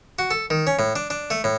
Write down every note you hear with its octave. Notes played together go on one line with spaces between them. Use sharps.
F#4
A4
D#3
C#4
A2
D4
D4
A3
A2